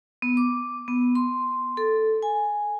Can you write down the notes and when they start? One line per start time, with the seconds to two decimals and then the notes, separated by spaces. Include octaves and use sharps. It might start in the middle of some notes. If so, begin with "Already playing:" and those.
0.22 B3
0.37 D6
0.88 B3
1.15 C6
1.77 A4
2.23 G#5